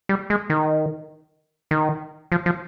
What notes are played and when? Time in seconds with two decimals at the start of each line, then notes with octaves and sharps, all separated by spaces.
0.09 G3
0.30 G#3
0.50 D#3
1.71 D#3
2.32 F3
2.46 F3